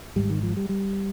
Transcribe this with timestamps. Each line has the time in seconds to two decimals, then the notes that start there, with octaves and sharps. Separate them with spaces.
0.16 G#1 G#2 G3
0.30 D#3
0.43 F3
0.57 G3
0.69 G3